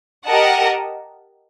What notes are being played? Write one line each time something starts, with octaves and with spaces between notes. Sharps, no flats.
G4 A#4 D#5 F#5 A5